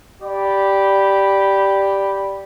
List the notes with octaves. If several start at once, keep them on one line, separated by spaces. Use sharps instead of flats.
G4 D5 B5